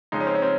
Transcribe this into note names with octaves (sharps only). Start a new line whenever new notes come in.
F2 C#3 G#3 D#4
C#4
C4
C#4
C4